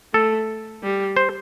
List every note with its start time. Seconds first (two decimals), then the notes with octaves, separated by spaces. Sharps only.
0.14 A3 A4
0.82 G3
1.17 C5